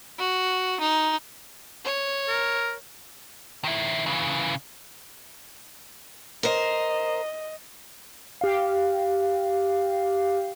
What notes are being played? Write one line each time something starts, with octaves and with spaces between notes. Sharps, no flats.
F#4
D#4
C#5
A#4
D#3 E4
C#3 E3
A#4 C5 D#5
G4 F5